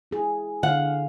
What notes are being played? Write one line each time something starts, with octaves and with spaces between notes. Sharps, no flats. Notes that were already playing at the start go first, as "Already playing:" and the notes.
E4 G#4
D3 F5 F#5